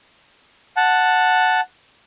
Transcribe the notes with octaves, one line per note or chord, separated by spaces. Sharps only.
F#5 A5